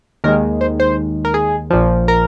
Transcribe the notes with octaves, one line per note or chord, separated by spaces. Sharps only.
D#2 D#3 G#3 A#4
C5
C5
A#4
G#4
A#1 A#2 F3
A#4